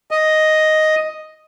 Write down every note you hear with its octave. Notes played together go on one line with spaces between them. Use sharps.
D#5